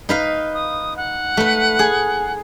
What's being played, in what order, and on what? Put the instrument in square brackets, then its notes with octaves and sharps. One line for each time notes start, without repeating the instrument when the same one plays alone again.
[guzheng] D#4 B4 F5
[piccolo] D#6
F#5
[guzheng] A3 B4
G#4